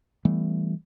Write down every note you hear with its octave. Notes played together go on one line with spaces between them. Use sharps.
E3 G3 A3 B3